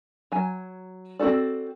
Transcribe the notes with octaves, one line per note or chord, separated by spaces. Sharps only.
F#3 G#5
C4 D#4 F#4 A4 D5